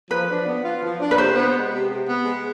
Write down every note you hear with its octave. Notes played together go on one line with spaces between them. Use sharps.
F3 B4
D4
B3
F4
F3
D4
B4
C3 C5
B3
G#3
C3
C3
B3
G#3